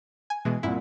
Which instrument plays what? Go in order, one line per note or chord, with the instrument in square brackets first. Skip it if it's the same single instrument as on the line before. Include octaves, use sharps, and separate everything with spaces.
[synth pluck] G#5
B2 E3 G#3
[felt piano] C2 A#2 [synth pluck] E4